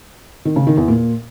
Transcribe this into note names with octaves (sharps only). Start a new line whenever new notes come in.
D#3
C#3
D#3
E2
A#2